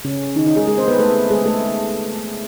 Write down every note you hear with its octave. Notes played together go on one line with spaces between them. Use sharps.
C#3 C#4
D#3 D#4
D#3 D#4
G#3 G#4
G#3 G#4
C4 C5
B3 B4
A3 A4
G#3 G#4
A3 A4